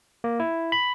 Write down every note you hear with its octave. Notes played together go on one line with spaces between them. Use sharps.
A#3
E4
B5